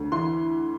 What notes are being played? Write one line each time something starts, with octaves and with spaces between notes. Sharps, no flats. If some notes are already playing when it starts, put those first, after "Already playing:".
Already playing: D2
E3 C6